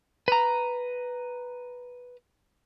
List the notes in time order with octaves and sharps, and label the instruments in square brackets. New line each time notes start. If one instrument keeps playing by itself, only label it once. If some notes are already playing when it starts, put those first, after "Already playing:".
[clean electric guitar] B4 A#5